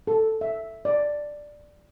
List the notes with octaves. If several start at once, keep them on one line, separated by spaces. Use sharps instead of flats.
A4
E5
D5